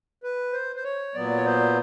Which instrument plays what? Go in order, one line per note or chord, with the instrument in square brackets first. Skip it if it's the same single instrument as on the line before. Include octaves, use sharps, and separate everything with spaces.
[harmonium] B4
C5
C5
C#5
A#2 F#3 B3 D5
C#5
C5